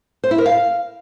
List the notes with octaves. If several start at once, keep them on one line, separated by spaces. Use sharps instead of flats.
C5
E4
A#4
F5